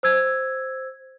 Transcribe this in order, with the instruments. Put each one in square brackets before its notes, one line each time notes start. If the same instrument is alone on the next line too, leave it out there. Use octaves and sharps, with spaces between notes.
[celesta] C5 E6 G#6